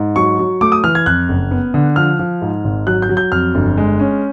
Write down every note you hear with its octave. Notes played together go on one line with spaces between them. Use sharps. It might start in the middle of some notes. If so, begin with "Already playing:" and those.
Already playing: G#2
F#3 C#6
F#3
A3 D6
D#6
E3 F6
G#6
F2 F#6
F#1
B3
D3
F3 F6
F3
G#2
G#1
F#3 F#6
G6
F#3
G6
F2 F6
G1
G#3
C#4